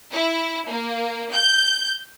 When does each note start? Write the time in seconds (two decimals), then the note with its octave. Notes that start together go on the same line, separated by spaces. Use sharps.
0.12 E4
0.69 A#3
1.34 G6